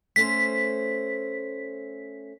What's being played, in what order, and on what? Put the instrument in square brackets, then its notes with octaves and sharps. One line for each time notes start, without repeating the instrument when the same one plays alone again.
[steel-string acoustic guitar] A3 C#4 C5 [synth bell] B6